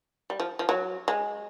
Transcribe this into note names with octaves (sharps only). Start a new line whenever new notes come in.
G3
F3
F3
F#3
G#3